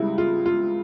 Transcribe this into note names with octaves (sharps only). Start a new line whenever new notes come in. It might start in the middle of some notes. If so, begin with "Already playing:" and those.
Already playing: C#2 C#3 G3 E4
F4
F4